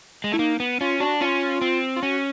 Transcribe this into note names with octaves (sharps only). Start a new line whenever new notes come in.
G#3
A3 E4
A#3 D#4
B3
C#4 F4
D4 F#4
C#4 F4
C4
F4
C#4 F#4